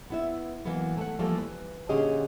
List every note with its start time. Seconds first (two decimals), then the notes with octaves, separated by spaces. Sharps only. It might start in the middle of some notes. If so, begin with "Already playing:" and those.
0.10 B3 E4 E5
0.66 E3 F#3 A#3 B3
0.97 A3 F#5
1.19 E3 F3 G3 A3 A#3
1.38 B4
1.89 A#2 D3 C#4 G4 G#4 D#5